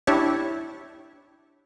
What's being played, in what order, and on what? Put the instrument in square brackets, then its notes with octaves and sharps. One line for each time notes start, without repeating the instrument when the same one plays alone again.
[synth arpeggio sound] D4 E4 G4 C#5